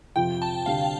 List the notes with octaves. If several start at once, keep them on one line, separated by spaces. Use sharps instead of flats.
F2 C3 F3 G5
A5
D2 C3 G3 D4 F5